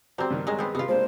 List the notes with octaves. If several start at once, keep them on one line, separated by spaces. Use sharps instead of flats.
G3 C4 F#4 C5 A#5
G2 D#3
F#3 G#3
B3 C4
C3 B3 F4
G#3 A#3 D4 C5